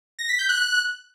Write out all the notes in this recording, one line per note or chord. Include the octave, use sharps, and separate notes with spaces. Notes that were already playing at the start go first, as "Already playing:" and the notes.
A#6
B6
G6
F#6